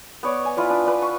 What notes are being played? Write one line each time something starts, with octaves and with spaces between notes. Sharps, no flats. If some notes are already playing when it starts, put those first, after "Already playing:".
B3 C#5 D5
G#5
E4 F4 B4 D5
D4
D4 B4
C#6